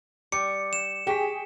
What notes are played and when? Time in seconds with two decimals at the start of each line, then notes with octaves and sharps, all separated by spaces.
0.32 G3 D6 C#7
0.73 E7
1.07 G4 G#4 G5 C#6 B6